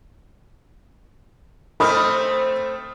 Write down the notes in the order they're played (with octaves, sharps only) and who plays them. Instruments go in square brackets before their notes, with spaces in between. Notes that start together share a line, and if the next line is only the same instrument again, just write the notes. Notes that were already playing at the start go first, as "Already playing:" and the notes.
[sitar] A3 C4 [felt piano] B5 D#6 F6